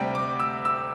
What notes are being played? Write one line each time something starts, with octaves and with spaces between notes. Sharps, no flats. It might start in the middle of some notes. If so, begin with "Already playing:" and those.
Already playing: D2 C3 G3 G5
D6
E6
E6